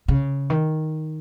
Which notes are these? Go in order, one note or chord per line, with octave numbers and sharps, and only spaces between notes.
C#3
D#3